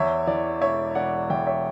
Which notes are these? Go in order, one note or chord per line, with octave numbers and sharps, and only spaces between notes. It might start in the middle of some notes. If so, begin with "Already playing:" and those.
Already playing: E2 C#5 E5
E3 D5
E1 C#5 E5
E1 D5 F#5
E2 E5 G5
C#5 E5